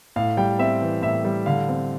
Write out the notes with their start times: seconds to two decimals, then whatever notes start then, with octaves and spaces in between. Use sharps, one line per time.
0.16 A2 F5
0.37 G3 G5
0.59 C4 E5
0.81 E3
1.02 A2 E5
1.25 G3
1.46 D3 F5
1.69 C4